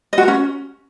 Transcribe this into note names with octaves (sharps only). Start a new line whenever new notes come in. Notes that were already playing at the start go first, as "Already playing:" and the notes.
D#5
F#4
A#4
C#4